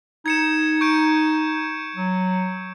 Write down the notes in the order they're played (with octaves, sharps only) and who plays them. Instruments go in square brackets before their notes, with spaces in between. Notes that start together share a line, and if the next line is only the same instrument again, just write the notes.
[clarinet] D#4 [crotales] G#6 C#7 E7
[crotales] C#6 G6 D7
[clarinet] F#3